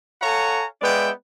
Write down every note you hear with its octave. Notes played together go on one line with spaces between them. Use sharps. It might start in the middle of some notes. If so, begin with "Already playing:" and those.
A4 C#5 F5 F#5 G#5 A#5
G#3 B3 B4 D5 E5 G5